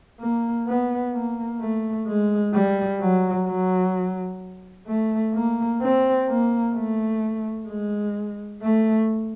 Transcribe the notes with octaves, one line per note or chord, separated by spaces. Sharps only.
A#3
B3
A#3
A3
G#3
G3
F#3
F#3
A3
A#3
C4
A#3
A3
G#3
A3